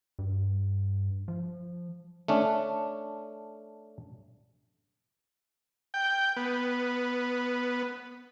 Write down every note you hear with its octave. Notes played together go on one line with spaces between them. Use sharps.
G2
F3
A3 C#4 D4
G5
B3